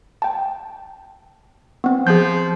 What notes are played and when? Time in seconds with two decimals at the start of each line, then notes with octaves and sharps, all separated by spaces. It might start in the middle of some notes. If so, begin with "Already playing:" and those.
0.22 G5 A5
1.84 B3 C4
2.07 F3 G#4 G6